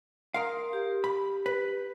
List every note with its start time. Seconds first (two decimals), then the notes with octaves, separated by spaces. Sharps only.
0.34 A#4 F5 C6 D#6
0.73 G4
1.04 B5
1.46 B4